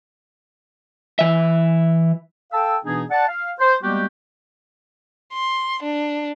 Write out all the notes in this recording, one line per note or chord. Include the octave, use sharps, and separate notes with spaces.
E3 E5
A4 F5 G5 A5 E6
B2 E3 B3 D4 D#4 G#4
D5 F#5 A5
F5
C5
G3 G#3 A#3 B3 F#4 G4
C6
D4